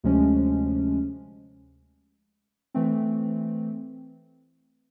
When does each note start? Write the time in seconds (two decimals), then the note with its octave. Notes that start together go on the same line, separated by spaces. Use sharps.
0.04 D2 C3 F3 G#3 C#4
2.74 E3 A3 C4